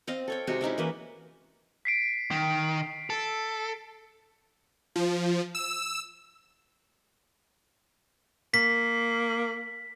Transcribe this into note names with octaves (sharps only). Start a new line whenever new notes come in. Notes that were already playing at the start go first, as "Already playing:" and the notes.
C4 D#5 F5
A4 C#5 G5
C3 G#3 D#4 F#4
G#3 C#4 D#4 E4
E3 A#3 B4
B6 C7 D7
D#3
A4
F3
E6
A#3 B6